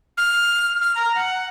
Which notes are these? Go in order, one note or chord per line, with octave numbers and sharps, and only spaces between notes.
F6
F6
A#5
F#5